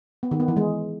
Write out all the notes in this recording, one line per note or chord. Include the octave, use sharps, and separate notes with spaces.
B3
D#3
B3
E3
G#3